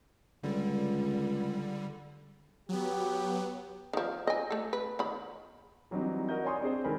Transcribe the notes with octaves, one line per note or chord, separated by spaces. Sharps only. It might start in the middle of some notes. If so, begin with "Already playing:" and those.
C#2 D3 G3
F#3 B3 G4
D#3 F3
D#5 G#5
A3 A4
B4
D#3 B5
E3 F#3 G3 C4 D4 D#4
F#4 A#4 D#5 G6
C#5 D5 G#5 C6 C#6 D#6
C4 D4 G#4 C5
D#3 G#3 A4 A#4 G#5 B5